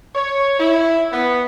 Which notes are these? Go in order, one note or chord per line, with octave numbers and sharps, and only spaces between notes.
C#5
E4
B3